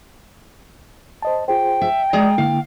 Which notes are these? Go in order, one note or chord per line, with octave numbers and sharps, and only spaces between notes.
C5 D#5 A5
F4 G#4 C5 G5
E5
G#3 G#4 D5 A#5
D3 A#3 E4 F5